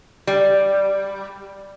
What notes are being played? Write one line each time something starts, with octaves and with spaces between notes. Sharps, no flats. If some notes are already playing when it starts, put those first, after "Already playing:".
G3